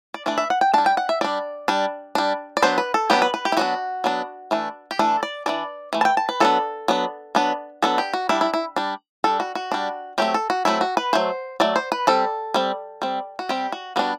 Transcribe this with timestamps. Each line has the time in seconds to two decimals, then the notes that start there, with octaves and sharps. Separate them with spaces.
0.14 D5
0.26 E3 A3 D4 D5
0.38 E5
0.50 F#5
0.61 G5
0.74 G3 D4 A5
0.86 G5
0.97 F#5
1.09 E5
1.21 G3 D4 D5
1.68 G3 D4
2.15 G3 D4
2.57 D5
2.62 F#3 B3 D4 C5
2.78 B4
2.94 A4
3.10 F#3 B3 D4 G4
3.22 B4
3.34 B4
3.45 G4
3.52 E4
3.57 F#3 B3 D4 F#4
4.04 F#3 B3 D4
4.51 E3 A3 D4
4.91 G4
4.99 E3 A3 D4 A4
5.23 D5
5.46 E3 A3 D4 D5
5.93 E3 A3
6.01 A5
6.05 G5
6.17 A5
6.29 B4
6.40 F#3 B3 D4 A4
6.88 F#3 B3 D4
7.35 F#3 B3 D4
7.82 F#3 B3 D4 A4
7.98 G4
8.13 F#4
8.29 G3 D4 E4
8.41 E4
8.54 E4
8.76 G3 D4
9.24 G3 D4 A4
9.40 F#4
9.55 F#4
9.72 G3 D4
10.18 F#3 A3 C4 G4
10.34 A4
10.50 F#4
10.65 F#3 A3 C4 E4
10.81 F#4
10.97 B4
11.13 F#3 A3 C5
11.60 F#3 A3 D5
11.76 C5
11.92 B4
12.07 G3 C4 A4
12.54 G3 C4
13.02 G3 C4
13.39 F#4
13.49 G3 C4 G4
13.72 F#4
13.96 G3 B3 D4 F#4